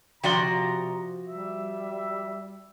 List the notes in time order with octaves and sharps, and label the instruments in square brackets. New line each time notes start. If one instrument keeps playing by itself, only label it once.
[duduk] C3 [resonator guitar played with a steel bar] F3 F#4 D5 [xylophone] G5 C6 [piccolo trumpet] A#5
[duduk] G3 [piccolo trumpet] E5